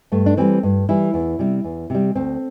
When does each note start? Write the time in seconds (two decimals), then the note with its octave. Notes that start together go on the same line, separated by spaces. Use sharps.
0.12 G2 A3
0.26 D4
0.37 E3 G3 C4
0.63 G2
0.89 E3 G3 E4
1.14 E2
1.39 C3 G3
1.64 E2
1.90 C3 G3
2.15 D2 C4